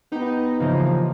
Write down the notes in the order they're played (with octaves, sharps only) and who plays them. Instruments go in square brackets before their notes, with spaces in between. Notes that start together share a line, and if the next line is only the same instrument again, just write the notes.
[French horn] B3 [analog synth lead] D#4 [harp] G4
[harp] C#3 E3 A#3 [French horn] F3